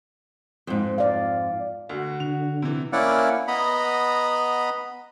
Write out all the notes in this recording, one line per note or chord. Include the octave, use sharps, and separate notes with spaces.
F2 G#2
D5 F5
D2 F#4
D3 F7
C3 E3
A#3 C#4 E4 D5 F#5
B3 D#5 A#5 B5